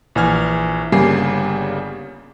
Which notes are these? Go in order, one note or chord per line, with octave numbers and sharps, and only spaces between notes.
A#1 E3 G#5 F6 G#6
G1 C#3 G3 A#3 G#5 C7